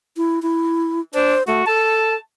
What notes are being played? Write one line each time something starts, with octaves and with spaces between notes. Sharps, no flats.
E4
E4
D4 C5
A3 F#4
A4 A5